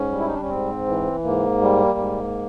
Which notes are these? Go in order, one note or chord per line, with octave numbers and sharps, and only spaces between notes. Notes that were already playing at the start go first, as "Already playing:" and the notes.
Already playing: G#2 C#4
G3
E4
D#4
D4
C#4
G#2 C4
E3
G#2 A#3
G3
G#2